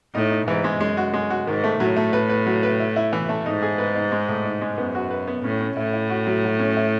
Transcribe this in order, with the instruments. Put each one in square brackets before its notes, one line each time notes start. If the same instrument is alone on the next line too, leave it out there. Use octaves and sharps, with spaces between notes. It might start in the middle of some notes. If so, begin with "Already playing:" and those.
[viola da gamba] A2 [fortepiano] D#4
[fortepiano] D#4
[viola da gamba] G#2 [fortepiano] E3
[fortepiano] G#3
[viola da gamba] F#2 [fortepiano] G#3
[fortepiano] F#4
G#3
F#4
[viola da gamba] G#2 [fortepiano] D#3
[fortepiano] A3
[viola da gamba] A2 [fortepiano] F#3
[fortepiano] A3
B4
B4
F#3
B4
E4
E4
E3
A3
[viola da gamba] G#2 [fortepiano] D#4
[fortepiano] G#4
B4
D#4
G#3
A2
D#4
G#3
[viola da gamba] F#2 [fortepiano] B3
[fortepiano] F#4
B4
B3
[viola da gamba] A2 [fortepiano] C#4
[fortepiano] C#4
[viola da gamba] A2 [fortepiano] E4
[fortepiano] E4
F#4
F#3
F#3
C#4
E4